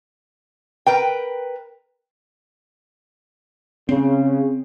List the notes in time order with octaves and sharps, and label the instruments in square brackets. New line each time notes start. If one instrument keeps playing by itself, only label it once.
[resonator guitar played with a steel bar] A#4 B4 G5
[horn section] C#3 [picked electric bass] C4